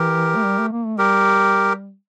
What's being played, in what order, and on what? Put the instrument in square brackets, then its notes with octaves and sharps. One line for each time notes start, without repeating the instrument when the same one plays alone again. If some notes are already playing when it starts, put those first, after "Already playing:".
Already playing: [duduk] E3 [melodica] G4 A#4
[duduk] A3
G3
A3
A#3
A3
[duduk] G3 [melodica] G4 A#4